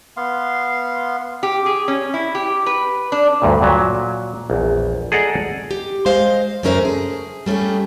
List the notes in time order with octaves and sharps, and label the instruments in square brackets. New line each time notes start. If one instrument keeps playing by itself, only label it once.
[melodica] B3 F5 C6
[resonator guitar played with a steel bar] G4
G#4
C#4
E4
G4
B4
D4
[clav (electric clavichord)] D2 G2 A#2
A#2 F#3 E5
A#1 E2
G#4 A4 D5 D#5 F#5 A#5
[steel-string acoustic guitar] G4
G#3 C5 D#5 F5
F#2 C#3 A3 C#4 A#4 C5
G#4
G3 A3 C#4 G4 G#4